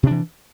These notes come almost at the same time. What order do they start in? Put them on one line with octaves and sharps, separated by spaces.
C3 D4 E3